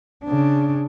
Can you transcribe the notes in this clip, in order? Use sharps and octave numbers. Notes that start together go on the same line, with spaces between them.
C#3 D4